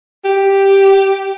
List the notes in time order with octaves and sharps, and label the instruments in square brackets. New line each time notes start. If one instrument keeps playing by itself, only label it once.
[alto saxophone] G4